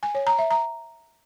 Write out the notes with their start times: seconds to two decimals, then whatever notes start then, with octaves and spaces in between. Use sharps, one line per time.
0.03 G#5
0.15 C#5
0.27 A#5
0.39 E5
0.51 A#5